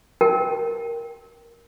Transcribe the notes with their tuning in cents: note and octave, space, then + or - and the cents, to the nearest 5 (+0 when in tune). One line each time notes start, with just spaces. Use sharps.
A#4 +0 G5 +0